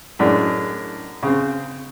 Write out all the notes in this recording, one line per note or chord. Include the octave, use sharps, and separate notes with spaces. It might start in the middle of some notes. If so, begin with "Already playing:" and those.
F#2 A2 G#3 D4
C#3 C4